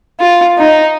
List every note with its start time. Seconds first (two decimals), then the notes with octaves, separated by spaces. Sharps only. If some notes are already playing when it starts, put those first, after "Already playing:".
0.20 F4
0.58 D#4